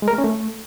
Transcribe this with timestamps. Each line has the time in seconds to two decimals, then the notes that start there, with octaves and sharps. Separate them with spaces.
0.02 G#3
0.08 A#4
0.13 A3
0.18 C#4
0.24 A3